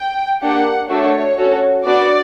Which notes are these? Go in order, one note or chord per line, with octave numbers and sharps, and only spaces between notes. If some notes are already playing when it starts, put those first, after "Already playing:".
Already playing: G5
A#3 D4 G4 F#5
A3 D4 F#4 A4 C#5
C#4 F#4 A4
B3 D4 F#4 D5